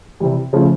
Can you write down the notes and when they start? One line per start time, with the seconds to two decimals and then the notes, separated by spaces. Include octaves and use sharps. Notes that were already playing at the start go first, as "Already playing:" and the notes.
0.20 C3 E3 G3
0.53 C#3 F3 A3 C#4